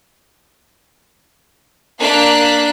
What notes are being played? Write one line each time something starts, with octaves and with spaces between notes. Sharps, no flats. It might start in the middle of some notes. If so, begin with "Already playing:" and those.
A#3 D4 F5 F#6 B6